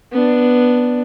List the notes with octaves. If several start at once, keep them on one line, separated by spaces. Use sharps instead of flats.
B3 D4